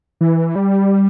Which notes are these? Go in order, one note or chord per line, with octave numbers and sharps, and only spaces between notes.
E3
G3